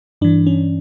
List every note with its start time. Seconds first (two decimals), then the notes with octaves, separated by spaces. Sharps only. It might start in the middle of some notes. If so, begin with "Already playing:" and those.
0.21 G2 E3 D4
0.47 C#4